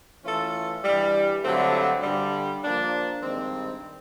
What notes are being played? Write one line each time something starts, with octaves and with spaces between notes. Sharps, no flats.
E3 A3 C#4 F4 A4
G2 E3 G3
G2 D3 F#3 A3 C4
G2 D3 G3
F3 A#3 D4
G2 D#3 G#3 C4